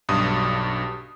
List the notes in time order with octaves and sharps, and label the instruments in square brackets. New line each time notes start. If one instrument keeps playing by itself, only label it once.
[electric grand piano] B1 G2 D#6